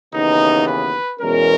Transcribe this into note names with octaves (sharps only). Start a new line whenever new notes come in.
D#2 C#3 E3 B3 D#4
B4
E2 B2 G#3 C#4 A#4